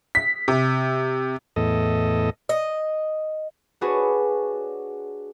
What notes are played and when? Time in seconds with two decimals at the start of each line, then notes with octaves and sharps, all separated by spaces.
0.15 B6
0.48 C3
1.56 E2 A2 A4 D#5
2.49 D#5
3.81 D4 F#4 G#4 B4 C#5